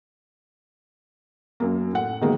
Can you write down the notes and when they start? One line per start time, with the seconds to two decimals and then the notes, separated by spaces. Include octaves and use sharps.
1.60 F#2 A#3
1.93 A2 F#5
2.21 D#3 F#3 G#3 A#3 B3